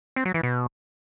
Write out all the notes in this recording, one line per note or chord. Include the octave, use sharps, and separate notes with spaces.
C4
F#3
E3
B2